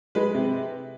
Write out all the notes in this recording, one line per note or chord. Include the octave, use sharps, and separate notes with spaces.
G#3 B4
C3